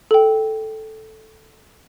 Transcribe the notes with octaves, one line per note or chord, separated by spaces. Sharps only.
A4 G5